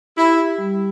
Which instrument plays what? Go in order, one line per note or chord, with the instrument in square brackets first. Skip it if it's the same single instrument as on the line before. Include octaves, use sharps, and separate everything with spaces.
[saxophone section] E4 [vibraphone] G4
[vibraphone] G3